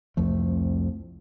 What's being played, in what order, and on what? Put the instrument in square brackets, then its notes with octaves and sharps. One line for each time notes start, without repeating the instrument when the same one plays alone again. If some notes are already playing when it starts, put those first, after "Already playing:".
[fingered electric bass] C2 F2 F3 A3